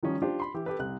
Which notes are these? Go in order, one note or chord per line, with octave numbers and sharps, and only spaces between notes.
D#3 F3 G3 C#4
D4 F4 G4 C5
B5 C6
E3 G4
G4 A4 B4
C2 F#6